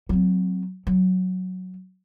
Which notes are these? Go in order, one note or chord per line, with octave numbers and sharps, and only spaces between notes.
F#3 C4
F#3